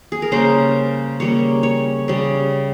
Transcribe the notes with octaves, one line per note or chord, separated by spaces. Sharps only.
G#4
A#4
C#3 G3 A#3 C5
C#3 G3 A#3 C#5
C#5
C#3 G3